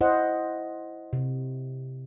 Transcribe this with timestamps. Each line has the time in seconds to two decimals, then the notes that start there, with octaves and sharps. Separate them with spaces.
0.01 E4 C5 D#5 F#5
1.13 C3